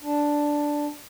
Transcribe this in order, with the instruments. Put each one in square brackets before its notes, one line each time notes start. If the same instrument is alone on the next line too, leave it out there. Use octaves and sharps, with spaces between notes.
[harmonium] D4